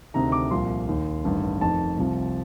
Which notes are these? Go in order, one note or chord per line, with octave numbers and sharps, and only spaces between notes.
D2 C3 D#3 A#5
D6
C2 A#2 F3 C6
D#2 D#3
A1 G2 D#3
F1 F2 D#3 A5
C2 C3 F3